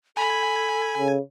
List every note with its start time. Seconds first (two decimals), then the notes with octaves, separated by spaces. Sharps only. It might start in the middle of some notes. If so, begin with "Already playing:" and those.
0.17 A4 G#5 B5
0.98 C#3